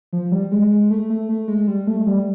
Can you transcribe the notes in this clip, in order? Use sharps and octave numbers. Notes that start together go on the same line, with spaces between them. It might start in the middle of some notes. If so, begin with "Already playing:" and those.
F3
G3
G#3
G#3
A3
A3
A3
G#3
G3
A3
G3